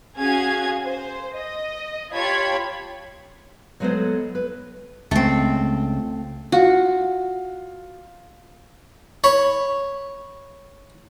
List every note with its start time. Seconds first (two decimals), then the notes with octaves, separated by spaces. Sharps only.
0.18 C#4 F#4 G#4 F5 G#5 G#6
0.85 C5
1.36 D#5
2.13 F4 G4 C#5 A5 B5 G#6
3.80 F#3 G#3 A3 B3 A4 C5
4.35 B4
5.11 C#2 A3 C4
6.52 F4 F#4
9.24 C#5 B5